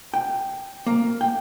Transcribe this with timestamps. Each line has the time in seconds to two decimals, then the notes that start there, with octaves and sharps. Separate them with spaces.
0.14 G5
0.87 A#3
1.21 G5